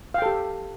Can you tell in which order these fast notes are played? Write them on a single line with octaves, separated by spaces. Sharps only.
F5 G5 A4 G4